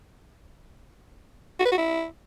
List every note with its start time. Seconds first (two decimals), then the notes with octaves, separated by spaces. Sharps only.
1.60 F#4
1.66 B4
1.72 F#4
1.78 E4